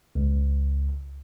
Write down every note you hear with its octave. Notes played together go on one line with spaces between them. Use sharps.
C#2